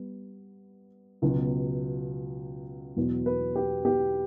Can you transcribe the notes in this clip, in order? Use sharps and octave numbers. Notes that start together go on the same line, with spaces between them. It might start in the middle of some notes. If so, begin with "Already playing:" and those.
Already playing: G3 B3
C#2 B2 F#3 B3
E2 B2 F#3 B3
B4
G4
G4